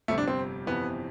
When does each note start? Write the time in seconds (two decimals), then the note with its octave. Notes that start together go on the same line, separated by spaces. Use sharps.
0.08 G1 F2 C3 G3 A3
0.18 D4
0.28 C4
0.66 G1 F2 C3 E3 B3